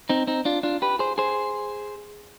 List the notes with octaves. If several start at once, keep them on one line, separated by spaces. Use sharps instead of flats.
C4 D#4
C4 D#4
D4 F4
D4 F4
G4 B4
G#4 C5
G#4 C5